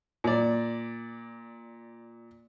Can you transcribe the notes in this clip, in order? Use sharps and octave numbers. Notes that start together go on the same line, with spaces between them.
A#2 D5